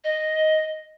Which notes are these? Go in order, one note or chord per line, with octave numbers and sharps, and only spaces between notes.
D#5